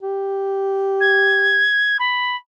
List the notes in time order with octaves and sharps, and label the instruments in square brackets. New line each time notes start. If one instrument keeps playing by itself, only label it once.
[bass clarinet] G4
[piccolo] G#6
B5